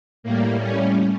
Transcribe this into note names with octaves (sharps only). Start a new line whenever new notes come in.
A2 G3 A#3
C#4